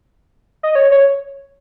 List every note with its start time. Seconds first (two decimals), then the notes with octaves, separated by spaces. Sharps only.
0.63 D#5
0.75 C#5
0.91 C#5